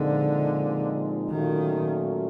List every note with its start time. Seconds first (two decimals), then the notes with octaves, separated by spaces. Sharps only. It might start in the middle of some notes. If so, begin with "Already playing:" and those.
Already playing: A#2 D3 F3 G#3 C4 D#4
1.30 A#2 D#3 F#3 A3 C#4 F4